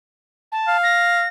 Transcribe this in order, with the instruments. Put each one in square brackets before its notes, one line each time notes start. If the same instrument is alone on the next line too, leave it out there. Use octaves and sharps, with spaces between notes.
[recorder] A5
[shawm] F5
[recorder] A#6